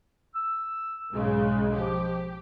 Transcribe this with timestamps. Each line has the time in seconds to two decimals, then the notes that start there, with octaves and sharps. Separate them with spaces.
0.35 E6
1.12 B1 G#2 C#3 G#3
1.76 F3 G4